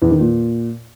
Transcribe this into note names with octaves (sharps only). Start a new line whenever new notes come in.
E2
D#3
A#2